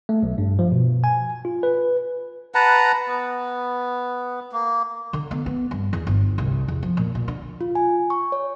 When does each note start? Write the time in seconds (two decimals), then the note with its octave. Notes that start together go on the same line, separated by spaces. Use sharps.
0.09 A3
0.23 B1
0.38 G2
0.59 F3
0.72 B2
1.04 G#5
1.45 F4
1.63 B4
2.55 B4 F#5 A5 A#5
3.08 B3
4.52 A#3
5.13 D3
5.31 B3
5.46 B3
5.71 G2
5.93 E2
6.07 G1
6.38 C2
6.68 E2
6.83 F3
6.97 A#2
7.15 A#2
7.28 D3
7.61 F4
7.75 G#5
8.10 C#6
8.32 C#5